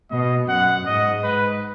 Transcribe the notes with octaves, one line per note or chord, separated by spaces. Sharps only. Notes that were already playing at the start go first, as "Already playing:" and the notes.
B2 D#5
F#2 F#5
G#2 D#5
B4